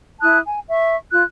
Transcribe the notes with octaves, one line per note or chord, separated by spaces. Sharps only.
E4 A5 D#6 F#6
G#5
E5 C#6
F4 F#6